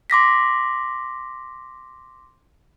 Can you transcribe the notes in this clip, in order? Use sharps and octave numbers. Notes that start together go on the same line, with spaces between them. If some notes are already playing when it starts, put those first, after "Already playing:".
C6 D6 A#6 B6